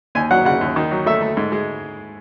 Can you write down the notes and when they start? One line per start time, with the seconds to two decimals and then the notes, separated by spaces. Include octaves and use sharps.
0.15 D#2 G#5
0.31 F#3 F#5
0.45 C#3 F#5
0.61 D#2
0.76 D#3
0.91 F#3
1.06 A3 E5
1.21 A3
1.37 G#2
1.52 G#3